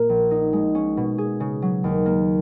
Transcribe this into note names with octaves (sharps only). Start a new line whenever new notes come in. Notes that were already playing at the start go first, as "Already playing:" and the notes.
Already playing: A#2 A#3
A#1
D#4
G#3
C#4
B2
G#4
C#3
F#3
D#2
A#3